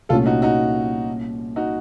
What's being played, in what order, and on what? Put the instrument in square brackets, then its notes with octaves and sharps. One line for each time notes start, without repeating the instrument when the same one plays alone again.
[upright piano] C2 A#2 A3 C#4 [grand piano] F4 A4
[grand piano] D#4 F#4
D#4 F#4
D#4 F#4